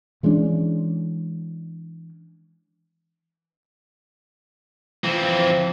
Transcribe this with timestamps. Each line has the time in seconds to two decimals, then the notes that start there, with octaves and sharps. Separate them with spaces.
0.23 E3 G#3 C#4 D4
5.04 E3 F3 C4